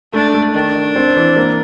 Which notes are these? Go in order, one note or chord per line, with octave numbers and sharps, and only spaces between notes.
A3 D4
A3
D#3 D4
D#3
C4
E3
A#3